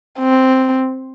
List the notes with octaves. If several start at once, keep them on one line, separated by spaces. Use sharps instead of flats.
C4